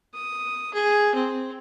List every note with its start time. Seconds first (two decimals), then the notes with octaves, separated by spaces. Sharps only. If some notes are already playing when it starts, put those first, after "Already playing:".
0.14 D#6
0.74 G#4
1.15 C4